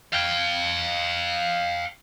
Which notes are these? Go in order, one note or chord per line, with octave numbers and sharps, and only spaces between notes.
F5 G5